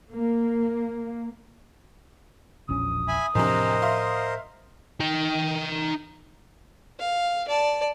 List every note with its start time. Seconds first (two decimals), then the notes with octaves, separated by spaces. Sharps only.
0.11 A#3
2.69 E1 A#1 C#4 D#6
3.08 E5 G#5 B5
3.35 E2 A2 C3 F3 D4 A#4 C5 D#5
3.82 E5 F5 C6
5.00 D#4 G5
6.99 F5
7.47 D5 A5